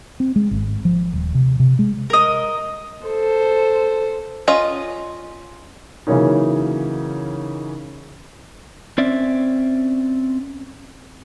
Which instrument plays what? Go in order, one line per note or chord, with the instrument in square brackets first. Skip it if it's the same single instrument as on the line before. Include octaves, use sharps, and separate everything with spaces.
[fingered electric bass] C4
G#3
G#1
F3
D#1
C3
C3
G#3
[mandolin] A#4 D#5
[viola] A4 C5
[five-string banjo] C#4 F4 D#5
[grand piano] C#3 E3 F#3 A#3 C#4 D#4
[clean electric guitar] C4 C#4 D5 E5